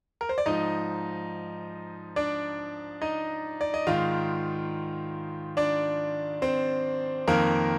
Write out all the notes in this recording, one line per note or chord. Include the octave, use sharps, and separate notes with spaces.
A#4
C5
D5
G#2 F3 D#4 D#5
D4 D5
D#4 D#5
D5
D#5
G#2 D#3 F4 F5
D4 D5
C4 C5
F2 D#3 A#3 A#4